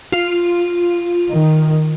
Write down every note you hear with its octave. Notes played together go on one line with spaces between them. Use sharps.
F4
D#3